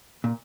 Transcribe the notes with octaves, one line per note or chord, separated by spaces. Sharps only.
A#2